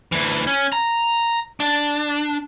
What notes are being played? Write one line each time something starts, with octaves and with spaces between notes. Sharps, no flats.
D2 E3
C#4
A#5
D4